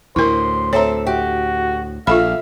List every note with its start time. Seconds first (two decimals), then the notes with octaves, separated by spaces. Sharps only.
0.16 D2 A2 E4 A#4 C5
0.73 C4 A4 C#5 E5 A#5
1.07 F#4 G4
2.07 A#1 F4 A4 E5 F5 B5